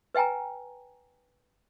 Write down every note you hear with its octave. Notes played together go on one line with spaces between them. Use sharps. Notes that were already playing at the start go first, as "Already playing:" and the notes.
B4 E5 G5 G#5 A#5